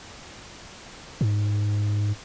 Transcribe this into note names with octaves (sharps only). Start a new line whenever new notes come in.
G#2